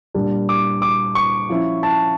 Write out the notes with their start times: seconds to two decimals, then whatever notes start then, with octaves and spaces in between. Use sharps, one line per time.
0.14 A#2 G3 D4
0.49 D6
0.82 D6
1.15 C#6
1.49 F3 C#4 E4
1.83 A5